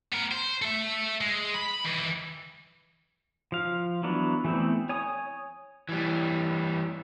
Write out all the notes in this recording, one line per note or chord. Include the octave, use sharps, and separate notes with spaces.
B3 A#4
C5
A4 E5
G#3
B5
D#3 E3
F3 F5
E3 F#3 B3 D4
E3 A3 B3 C4
C#5 G#5 D#6
E3 G3